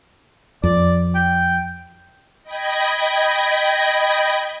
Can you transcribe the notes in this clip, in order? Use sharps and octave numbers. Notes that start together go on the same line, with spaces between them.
F2 D5
G5
D#5 G5 B5 G#6 A#6